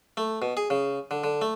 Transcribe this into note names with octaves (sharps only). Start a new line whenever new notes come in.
A3
B2
G#4
C#3
D3
D3
A3